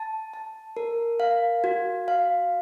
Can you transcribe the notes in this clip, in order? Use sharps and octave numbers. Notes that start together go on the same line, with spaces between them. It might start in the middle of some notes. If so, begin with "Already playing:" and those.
Already playing: A5
A5
A#4
F5
F#4
F5